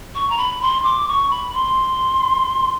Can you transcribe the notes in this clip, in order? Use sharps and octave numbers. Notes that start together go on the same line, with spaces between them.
C#6
A#5
B5
C6
D6
C#6
B5
C6